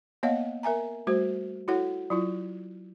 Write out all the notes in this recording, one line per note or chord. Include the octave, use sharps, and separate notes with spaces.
A#3 B3 C#5 D#5 F5 F#5
A#4 E5 G#5 A#5
G3 A3 F#4 C5
E4 F#4 A4 C#5 F#5
F#3 E4 F4